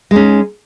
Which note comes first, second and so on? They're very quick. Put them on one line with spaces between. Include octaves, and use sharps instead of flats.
G#3 D#4 C#4